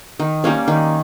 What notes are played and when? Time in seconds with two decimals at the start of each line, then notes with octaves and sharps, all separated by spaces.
0.20 D#3
0.44 G3 A#3 C#4
0.68 D#3